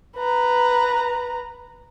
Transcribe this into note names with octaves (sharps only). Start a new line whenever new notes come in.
B4 A#5